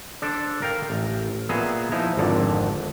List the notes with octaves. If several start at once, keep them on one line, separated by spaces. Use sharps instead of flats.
D4 A4 C5 D5
A#4 F5 G5 A#5
A1
A#2 B3 G#4 E5 A#5
F3 D#4 E4 A#5
G#1 F2 D3 D5